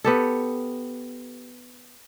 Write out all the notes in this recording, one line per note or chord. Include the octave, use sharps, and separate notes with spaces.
B3 G4 A4